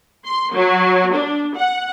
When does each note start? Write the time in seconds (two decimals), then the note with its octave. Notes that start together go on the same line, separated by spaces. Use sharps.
0.25 C6
0.54 F#3
1.14 D4
1.55 F#5